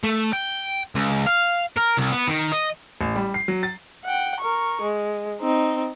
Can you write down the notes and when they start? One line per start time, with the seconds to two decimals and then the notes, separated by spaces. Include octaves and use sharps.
0.04 A3
0.33 G5
0.95 C#2
1.26 F5
1.77 A#4
1.98 C2
2.12 B3
2.28 D#3
2.52 D#5
3.01 A1
3.16 G3
3.34 C7
3.48 F#3
3.63 A6
4.04 F#5 G5
4.40 A#4 C#6
4.82 G#3
5.41 C4 D#4